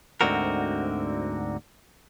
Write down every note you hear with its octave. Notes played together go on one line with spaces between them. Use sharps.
D2 G#2 D3 C4 F#4 A#4